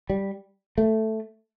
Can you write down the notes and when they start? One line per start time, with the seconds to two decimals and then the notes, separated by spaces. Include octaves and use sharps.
0.10 G3
0.78 A3